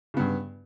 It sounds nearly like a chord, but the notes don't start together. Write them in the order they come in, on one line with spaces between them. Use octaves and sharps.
C#3 B3 G2